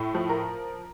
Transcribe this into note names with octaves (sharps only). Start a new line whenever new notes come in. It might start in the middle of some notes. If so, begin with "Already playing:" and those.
Already playing: A2
F3
A#4